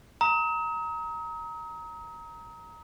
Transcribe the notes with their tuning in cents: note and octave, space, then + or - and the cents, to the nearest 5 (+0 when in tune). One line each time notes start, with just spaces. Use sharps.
A#5 +0 D#6 +40